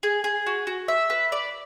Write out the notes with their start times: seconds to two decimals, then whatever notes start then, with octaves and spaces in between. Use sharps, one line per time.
0.03 G#4
0.24 G#4
0.47 F#4
0.67 F#4
0.88 E5
1.10 B4
1.32 D5